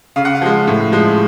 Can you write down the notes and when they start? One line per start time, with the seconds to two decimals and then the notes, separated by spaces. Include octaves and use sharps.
0.16 C#3 F5
0.25 F#5
0.35 F5
0.42 F3 G#3
0.67 A2
0.92 F3 G#3